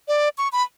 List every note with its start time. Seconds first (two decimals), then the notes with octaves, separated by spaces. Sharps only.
0.08 D5
0.38 C#6
0.53 B5